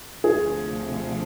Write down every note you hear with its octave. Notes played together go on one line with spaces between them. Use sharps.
D2 C3 F3 G#4